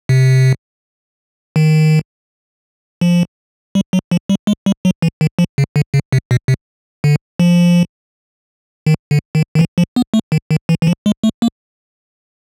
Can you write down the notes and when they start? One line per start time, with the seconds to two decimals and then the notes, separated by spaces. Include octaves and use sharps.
0.09 C3
1.56 D#3
3.01 F3
3.75 G3
3.93 F#3
4.11 F3
4.29 G3
4.47 G#3
4.66 G3
4.85 F#3
5.02 E3
5.21 D#3
5.39 F3
5.58 C#3
5.76 D3
5.94 C#3
6.13 C3
6.31 B2
6.48 C3
7.04 D3
7.40 F3
8.86 D#3
9.11 D3
9.35 D#3
9.55 D#3
9.59 E3
9.78 F3
9.96 B3
10.14 A3
10.32 D#3
10.51 D#3
10.69 E3
10.82 E3
10.87 F3
11.06 G#3
11.24 A3
11.42 A#3